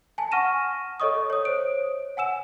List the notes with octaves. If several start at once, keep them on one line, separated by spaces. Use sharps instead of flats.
G#5 A5
F#5 C#6 F6 A#6 D#7 E7
A4 C#5 D#5 C#6 D#6
C#5 D#6
C5 C#5 D7
F#5 G#5 E6 E7